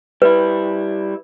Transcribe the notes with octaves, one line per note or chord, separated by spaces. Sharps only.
G3 E4 B4